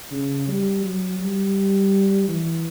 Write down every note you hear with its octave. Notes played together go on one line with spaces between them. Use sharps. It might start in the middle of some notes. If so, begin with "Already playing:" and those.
C#3
G3
F#3
G3
E3